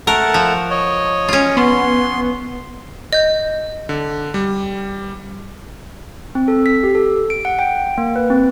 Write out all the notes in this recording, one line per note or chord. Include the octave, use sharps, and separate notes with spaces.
A3 A#4 F#5 A5
F3
C#5 D#5
C#4 F4
B3 C6
D#5 G6
D3
G3
C4
A4
B6
G4
A4
D7
F#5
G5
A#3
B4
C4